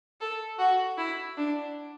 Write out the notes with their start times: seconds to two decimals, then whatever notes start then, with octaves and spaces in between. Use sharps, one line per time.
0.21 A4
0.59 F#4
0.97 E4
1.37 D4